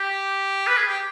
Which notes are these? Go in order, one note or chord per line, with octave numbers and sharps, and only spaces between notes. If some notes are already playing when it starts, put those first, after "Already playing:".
Already playing: G4
B4
G#4
G4